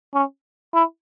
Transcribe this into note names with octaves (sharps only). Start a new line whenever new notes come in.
C#4
E4